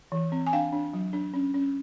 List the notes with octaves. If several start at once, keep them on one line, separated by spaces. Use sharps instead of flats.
E3
C4
G#5
D4 F5 G5
D4
F#3
D4
C#4
C#4